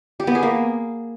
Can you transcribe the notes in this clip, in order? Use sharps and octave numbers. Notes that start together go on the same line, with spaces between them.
G4
B3
G#4
A#3